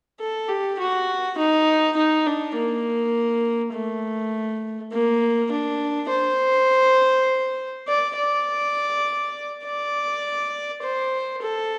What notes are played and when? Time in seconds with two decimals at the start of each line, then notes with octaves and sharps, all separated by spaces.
0.20 A4
0.49 G4
0.79 F#4
1.38 D#4
1.97 D#4
2.27 D4
2.56 A#3
3.74 A3
4.92 A#3
5.52 D4
6.10 C5
7.88 D5
8.17 D5
9.65 D5
10.83 C5
11.42 A4